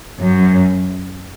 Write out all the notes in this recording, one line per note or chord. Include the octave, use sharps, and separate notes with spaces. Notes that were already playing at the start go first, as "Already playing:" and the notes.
F#2